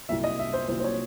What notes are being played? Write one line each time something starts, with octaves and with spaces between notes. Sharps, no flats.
C2 A#2 F#3 E5
D#5
E5
C5
C2 A#2 F#3 C5
C5
C#5